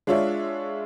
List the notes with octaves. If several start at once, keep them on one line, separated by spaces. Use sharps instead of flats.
G#3 D4 F4 C#5 E5